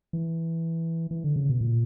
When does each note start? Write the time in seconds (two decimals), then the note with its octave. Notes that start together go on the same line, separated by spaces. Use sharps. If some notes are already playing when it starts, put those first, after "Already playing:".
0.13 E3
1.11 E3
1.24 D3
1.36 C#3
1.49 B2
1.61 A#2